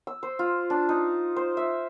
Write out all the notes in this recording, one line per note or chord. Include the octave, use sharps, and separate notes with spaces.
E6
C5
F4
D4
D#4
C5
E5